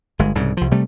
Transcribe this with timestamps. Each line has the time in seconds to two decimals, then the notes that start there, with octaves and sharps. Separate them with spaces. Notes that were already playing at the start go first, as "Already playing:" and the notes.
0.19 G1 G#3
0.35 C2 G#2 C#3
0.57 C2 F3
0.71 C3 G3 A3